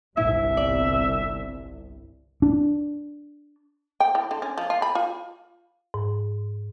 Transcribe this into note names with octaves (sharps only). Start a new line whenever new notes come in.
G1 C2 G2 E4 E5
D5
D4
G5
E3
D3
C#4
F3
F4
B5
F4
G#2